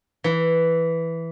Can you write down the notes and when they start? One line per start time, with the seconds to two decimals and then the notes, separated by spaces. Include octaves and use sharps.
0.24 E3